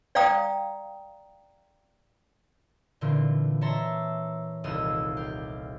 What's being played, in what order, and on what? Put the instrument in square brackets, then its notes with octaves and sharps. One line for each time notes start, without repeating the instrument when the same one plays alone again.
[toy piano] D5 F5 G5 A#5 D#6
[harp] A#2 D3 E3 C4 F4
C#5 E5 A5 A#5 C6
D#1 C2 F5 D#6 E6
G4 F5